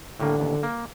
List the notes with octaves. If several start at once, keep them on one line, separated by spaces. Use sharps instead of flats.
A2 D3 G3 A#3
A1 D#2
A#3